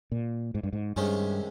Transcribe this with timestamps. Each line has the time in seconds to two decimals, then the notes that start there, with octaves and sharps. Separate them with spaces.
0.12 A#2
0.55 G#2
0.63 G2
0.73 G#2
0.96 C2 G2 C3 D#3 G#3 C#4